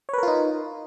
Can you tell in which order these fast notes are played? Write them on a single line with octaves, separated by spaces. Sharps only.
C#5 B4 A#4 F4 D#4